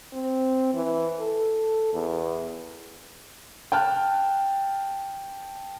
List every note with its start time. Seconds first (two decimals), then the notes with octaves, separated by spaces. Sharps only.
0.13 C4
0.74 E3
1.20 A4
1.93 E2
3.72 G5 A5 F6 F#6